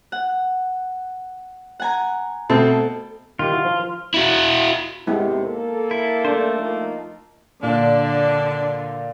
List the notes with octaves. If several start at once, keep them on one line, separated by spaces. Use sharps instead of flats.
F#5
F#5 G#5 A#5
B2 A3 C4 A4
D#3 F4 G4
E4 F#4
F3
E4 F#4
D#2 C3 G#3 B3 E4
A#3 A4
E4
A3 D4 C5
F3 A#3 D#4
A#2 D3 D4